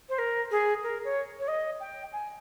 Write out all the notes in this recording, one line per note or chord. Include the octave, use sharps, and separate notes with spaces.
C5
A#4
G#4
A#4
C#5
C#5
D#5
G5
G#5